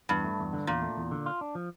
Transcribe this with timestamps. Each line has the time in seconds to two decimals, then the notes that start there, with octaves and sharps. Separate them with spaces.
0.09 E2 G2
0.25 A3
0.39 E2
0.53 D3
0.67 E2 A#2
0.82 A3
0.97 E2
1.11 D3
1.26 F4
1.41 D4
1.55 F3